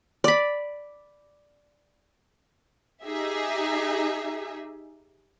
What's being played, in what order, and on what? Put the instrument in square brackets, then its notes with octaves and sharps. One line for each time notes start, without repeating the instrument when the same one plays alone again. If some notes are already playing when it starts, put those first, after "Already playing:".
[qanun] D5 B5
[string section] D#4 G4 G#4 E5